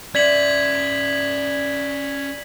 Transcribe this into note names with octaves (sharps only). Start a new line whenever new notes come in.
C#4 D5 E5 G#6 B6 F#7